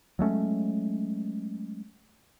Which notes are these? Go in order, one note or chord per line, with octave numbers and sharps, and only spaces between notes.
F#3 G#3 A3 C#4